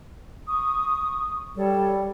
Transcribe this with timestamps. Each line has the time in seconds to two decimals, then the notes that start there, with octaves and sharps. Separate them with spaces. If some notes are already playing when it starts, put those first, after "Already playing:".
0.46 C#6 D#6
1.55 G3 A4 C#5 D5